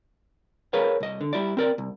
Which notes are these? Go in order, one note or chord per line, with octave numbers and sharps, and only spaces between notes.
G#4 A#4 B4 C#5 F5
C2 D#5
D3
G3 E4 D5
C4 A#4 D5
C2